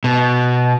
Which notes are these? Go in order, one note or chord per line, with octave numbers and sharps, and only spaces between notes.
B2